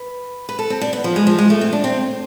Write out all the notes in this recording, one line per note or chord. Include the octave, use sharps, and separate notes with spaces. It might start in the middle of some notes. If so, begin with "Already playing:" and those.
Already playing: B4
B4
A4
C4
D4
B3
F3
G#3
F3
G#3
A3
C4
D4
C4